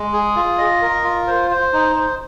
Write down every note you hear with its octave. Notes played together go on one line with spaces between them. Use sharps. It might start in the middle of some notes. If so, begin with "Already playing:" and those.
Already playing: G#3
G#4
F4
D#5
A#4
F4
C5
C5
D#4
C5